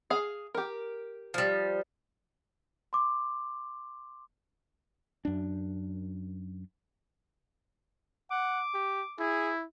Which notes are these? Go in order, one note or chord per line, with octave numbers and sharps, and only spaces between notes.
G#4 F5
G4 A#4
F3 G3
C6 D6
F#2 D4
F#5 D6
G4
E4 G#4